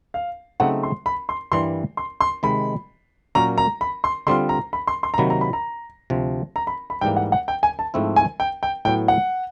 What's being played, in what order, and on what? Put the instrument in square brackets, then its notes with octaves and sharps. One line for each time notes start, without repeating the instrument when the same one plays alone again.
[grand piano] F5
[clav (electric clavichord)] C#3 F#3 A3 C4 D#4 [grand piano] F#5
[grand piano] C6
B5
C6
[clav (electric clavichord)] G2 E3 G3 A#3 [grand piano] C6
[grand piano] C6
C6
[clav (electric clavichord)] C3 D#3 G#3 [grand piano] B5
[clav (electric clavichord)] A#2 F#3 A#3 C#4 [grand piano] A#5
[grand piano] A#5
B5
C6
[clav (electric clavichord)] D3 G3 C4 F4 [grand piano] C6
[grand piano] A#5
B5
C6
C6
A#5
[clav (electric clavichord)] C3 D#3 F#3 A#3 [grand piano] B5
[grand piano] A#5
B5
A#5
[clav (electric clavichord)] D2 C3 F3
[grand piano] A#5
B5
B5
[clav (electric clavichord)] G#2 E3 G3 A#3 [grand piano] G5
[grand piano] F#5
F#5
G5
G#5
A5
[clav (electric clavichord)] G#2 F3 A3 C4 E4
[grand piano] G#5
G5
G5
[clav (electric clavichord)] A2 F#3 B3 [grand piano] G5
[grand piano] F#5